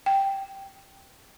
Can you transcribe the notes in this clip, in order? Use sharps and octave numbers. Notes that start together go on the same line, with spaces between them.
G5